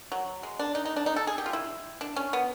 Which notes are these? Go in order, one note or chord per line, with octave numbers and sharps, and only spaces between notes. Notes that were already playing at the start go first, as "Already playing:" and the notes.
F#3
G#3
D4
D#4
D#4
D4
D#4
A4
G#4
G4
F4
E4
D4
C#4
B3